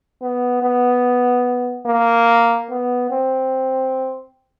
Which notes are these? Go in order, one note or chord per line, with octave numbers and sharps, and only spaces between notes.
B3
B3
A#3
B3
C4